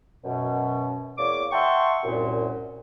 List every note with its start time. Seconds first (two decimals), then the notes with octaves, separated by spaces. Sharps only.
0.24 F#2 B2
1.18 E2 A#3 C#5 D5 D6
1.52 E5 F#5 G5 A5 C6 C#6
2.04 C2 F#2 A#2